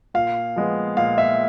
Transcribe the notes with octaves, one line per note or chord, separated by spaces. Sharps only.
A#2 F5
F3 G#3 B3
A#2 F5
E5